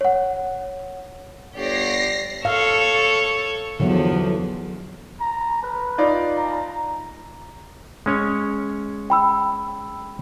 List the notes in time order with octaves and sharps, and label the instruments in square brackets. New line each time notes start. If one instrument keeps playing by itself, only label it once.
[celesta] C#5 F#5
[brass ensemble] G1 D3 C#5 [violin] G4 D5 [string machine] A#6 C7
[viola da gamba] A4 C#5 [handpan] F5
[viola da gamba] E2 F3 [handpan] D3 F#3
[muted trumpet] A#5
B4
[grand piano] D#4 F4 D5
[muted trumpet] A#5
[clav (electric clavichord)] G#3 C#4 C#5
[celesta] G5 B5 E6